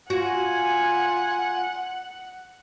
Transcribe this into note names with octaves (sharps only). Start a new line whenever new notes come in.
F4 F#4 F#5 G#5